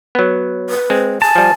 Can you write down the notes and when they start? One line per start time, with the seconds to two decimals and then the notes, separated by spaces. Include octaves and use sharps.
0.15 F#3 B3
0.70 B4
0.90 G#3 C4
1.22 G#5 A5
1.35 F3 G3